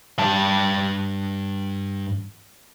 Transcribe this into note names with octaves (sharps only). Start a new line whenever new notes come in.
G2 A5